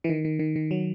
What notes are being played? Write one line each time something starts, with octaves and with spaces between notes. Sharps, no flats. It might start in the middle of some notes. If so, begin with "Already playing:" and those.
E3
D#3
D#3
D#3
D#3
F#3